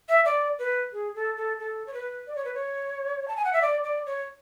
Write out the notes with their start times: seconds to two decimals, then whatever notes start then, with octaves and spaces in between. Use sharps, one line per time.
0.09 E5
0.25 D5
0.59 B4
0.93 G#4
1.15 A4
1.37 A4
1.60 A4
1.87 C#5
1.93 B4
2.27 D5
2.36 C#5
2.45 B4
2.54 C#5
3.28 A5
3.37 G#5
3.45 F#5
3.53 E5
3.62 D5
3.84 D5
4.06 C#5